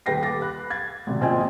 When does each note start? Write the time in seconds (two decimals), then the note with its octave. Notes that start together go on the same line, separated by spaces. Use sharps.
0.06 D#1 B4 G5 A#6 C7
0.23 D6 A6 A#6
0.41 B5 F#6
0.70 G#6 A6
1.07 G#1 C3
1.21 A#1 A#2 C4 D#5 G5 G#5